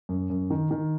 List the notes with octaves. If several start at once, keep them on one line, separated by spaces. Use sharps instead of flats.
F#2
F#2
D#3
D#3